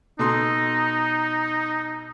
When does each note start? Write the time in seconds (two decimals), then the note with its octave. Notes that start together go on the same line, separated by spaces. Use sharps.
0.19 B2 D#4 A4 C6